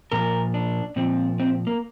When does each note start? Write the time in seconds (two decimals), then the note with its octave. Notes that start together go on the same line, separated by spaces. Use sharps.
0.12 A#2 F3 A#4
0.54 D4
0.96 A#2 F3 C4
1.40 C4
1.67 A#3